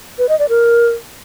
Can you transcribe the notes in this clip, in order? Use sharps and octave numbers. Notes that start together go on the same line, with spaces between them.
B4
D#5
D5
A#4